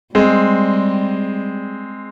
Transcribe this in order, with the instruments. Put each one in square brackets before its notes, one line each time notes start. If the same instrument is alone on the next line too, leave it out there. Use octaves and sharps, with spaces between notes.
[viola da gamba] G3 [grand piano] G#3 C4